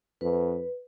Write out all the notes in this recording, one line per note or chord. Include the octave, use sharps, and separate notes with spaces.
F2 B4